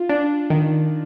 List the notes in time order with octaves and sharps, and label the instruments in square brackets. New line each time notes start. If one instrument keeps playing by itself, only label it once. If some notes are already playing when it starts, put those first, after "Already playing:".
Already playing: [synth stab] F4
D4
D#3